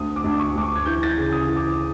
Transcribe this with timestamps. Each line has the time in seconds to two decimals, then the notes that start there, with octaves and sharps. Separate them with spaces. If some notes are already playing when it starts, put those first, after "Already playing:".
Already playing: D2 D#6
0.16 D6
0.24 D2
0.39 C#6
0.56 D2 D6
0.63 C#6
0.75 G#6
0.86 E3 G6
1.03 A6
1.09 G#6
1.18 C#3
1.32 D#6
1.47 E3
1.56 D6